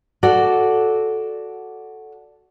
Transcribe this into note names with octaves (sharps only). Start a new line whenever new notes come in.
F#4 A4 D5